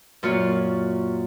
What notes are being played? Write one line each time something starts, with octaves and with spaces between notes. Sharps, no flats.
F#2 A#2 F4 C#5